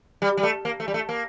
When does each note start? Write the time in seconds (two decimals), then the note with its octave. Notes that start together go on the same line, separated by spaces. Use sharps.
0.22 G3
0.37 G3
0.43 A3
0.65 A#3
0.80 A3
0.88 G3
0.94 A3
1.09 A#3